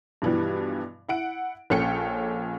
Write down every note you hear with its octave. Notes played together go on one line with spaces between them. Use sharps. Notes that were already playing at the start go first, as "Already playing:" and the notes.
G2 B2 E3 F3 G3
E4 F#5 D7
A#1 A#2 C#4 A4 G5 C#7